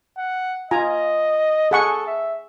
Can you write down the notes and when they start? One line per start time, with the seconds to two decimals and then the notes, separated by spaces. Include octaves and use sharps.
0.18 F#5
0.71 F4 D#5 G#5 A#5
1.71 G#4 A4 F#5 C#6
2.07 E5